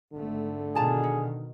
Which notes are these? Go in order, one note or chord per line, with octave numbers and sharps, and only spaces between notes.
G#1 D3 A3
B2 D#3 F4 G#4 A5 A#5
D#4